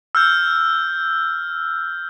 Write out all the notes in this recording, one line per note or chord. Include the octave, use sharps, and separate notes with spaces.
E6 F6 G6